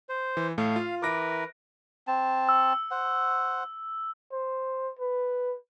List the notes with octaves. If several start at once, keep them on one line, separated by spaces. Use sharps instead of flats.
C5
E3
A2 A3 F5
F4
E3 A#4 B4 D6 A#6 D7
C4 A5
E6
C5 F#5
C5
B4